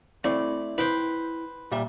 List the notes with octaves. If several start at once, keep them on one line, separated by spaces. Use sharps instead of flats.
A3 C4 E4 D5
E4 B4 C5 G5
A#2 G3 E5